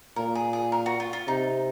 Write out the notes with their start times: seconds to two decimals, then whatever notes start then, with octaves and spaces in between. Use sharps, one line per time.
0.16 A#2 A#4
0.35 G#4
0.53 G#4
0.72 A#4
0.86 F#4
1.00 F4
1.13 F4
1.28 C3 D#4